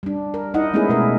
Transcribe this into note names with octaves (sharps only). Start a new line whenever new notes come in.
G3 D4
A#4
D#4 E4 D#5 F#5
G#3 A3 B3 C#4 E4 G#4
B2 G#3 E4 A#4